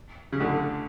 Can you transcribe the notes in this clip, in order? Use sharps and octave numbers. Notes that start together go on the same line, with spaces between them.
C#3
D2 D3